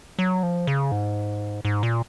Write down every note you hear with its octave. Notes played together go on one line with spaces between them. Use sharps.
F#3
F3
C#3
G#2
G#2
A#2